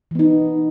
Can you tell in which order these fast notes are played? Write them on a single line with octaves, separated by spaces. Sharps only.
E3 B3 D#4